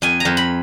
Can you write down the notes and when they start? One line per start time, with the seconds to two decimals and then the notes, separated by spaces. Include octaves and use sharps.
0.02 F2 G#5
0.20 F2 A#5
0.37 B5